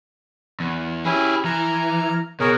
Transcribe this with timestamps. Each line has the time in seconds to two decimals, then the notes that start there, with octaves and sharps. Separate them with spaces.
0.60 E2
1.05 C#4 E4 G4 G#4
1.45 E3 A#5 F6
2.40 B2 B3 G#4 A#4 C#5